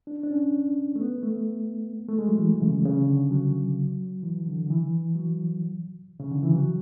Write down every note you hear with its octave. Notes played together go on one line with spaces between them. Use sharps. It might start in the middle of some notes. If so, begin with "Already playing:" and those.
D4
D4
C#4
A3
B3
A3
A3
G#3
F#3
E3
C#3
C#3
D3
F#3
E3
D3
D3
E3
F#3
C#3
D3
E3
F#3